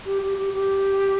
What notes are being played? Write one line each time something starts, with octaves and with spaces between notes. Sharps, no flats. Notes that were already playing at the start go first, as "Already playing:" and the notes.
G4
G4
G4
G4